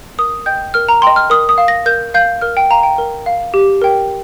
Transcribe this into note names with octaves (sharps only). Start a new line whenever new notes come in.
A#4 D#6
D#5 G5 G6
A#4 F6
A#5
D#5 G5 C6
F6
A#4 D#6
D#6
F5
A#6
A#4 G6
F5 G6
A#4 F6
G5
F5 A#5
G5
A#4
F5
G4
A#4 G5